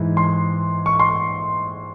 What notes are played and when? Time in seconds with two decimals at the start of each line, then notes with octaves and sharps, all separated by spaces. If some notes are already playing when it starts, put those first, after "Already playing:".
Already playing: G#2 E3
0.17 C6
0.86 C#6
1.00 C6